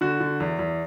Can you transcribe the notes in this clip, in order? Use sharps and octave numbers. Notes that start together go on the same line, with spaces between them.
D3 F#4
D3
E2
E2